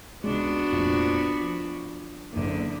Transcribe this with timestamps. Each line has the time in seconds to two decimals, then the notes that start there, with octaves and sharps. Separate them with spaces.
0.24 C#2 G#3 B3 D4 F#4
0.72 F1 A#1
1.41 F3
2.33 F#1 E2 D3 A#3